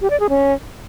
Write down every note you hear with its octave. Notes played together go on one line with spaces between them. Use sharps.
G4
D5
G#4
C#4